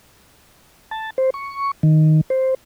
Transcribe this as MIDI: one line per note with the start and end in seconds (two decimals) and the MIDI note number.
0.91 1.10 81
1.18 1.30 72
1.34 1.71 85
1.83 2.21 51
2.30 2.54 72